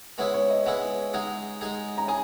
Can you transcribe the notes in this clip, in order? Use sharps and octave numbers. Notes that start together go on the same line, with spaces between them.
G#3 B3 E4 G#4 C#5
C#5
D#5
G#3 B3 E4 G#4
G#3 D#4 G#4 F#5
G#3 D#4 G#4
A#5
G#4 G#5